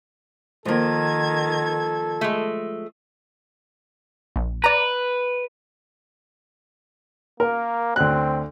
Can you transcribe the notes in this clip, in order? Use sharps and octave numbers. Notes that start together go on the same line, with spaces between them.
D#3 F3 A#3 A4 G#6
G#3 A3
A#1
B4 D5 A#5
A#3 A#4
D2 C4 F#6